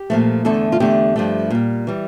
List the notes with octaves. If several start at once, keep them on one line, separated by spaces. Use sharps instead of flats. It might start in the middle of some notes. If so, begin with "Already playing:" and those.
Already playing: G4
A#2 F3 A3
E2 D3 A3 A4
F4
E2 D3 A3 G4
G2 F3 A3
A#2 G3
E3 G3